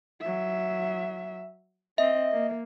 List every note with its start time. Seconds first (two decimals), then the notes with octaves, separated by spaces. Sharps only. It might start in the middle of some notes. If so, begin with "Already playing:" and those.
0.21 F#3 E5
1.98 C4 D#5 E5
2.33 A#3